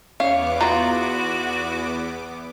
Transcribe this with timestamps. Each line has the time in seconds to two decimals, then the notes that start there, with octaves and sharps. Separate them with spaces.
0.20 E2 B3 C#4 C#5 F5 D6
0.61 E3 F4 F#4 A#5